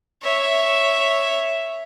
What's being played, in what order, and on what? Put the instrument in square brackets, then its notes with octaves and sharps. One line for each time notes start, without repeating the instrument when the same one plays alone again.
[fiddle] C#5 E5